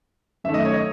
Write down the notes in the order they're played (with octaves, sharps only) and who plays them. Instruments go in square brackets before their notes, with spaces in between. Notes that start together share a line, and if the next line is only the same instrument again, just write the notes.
[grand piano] F#2 D#3 A3 E5
D#5
C#5
D#5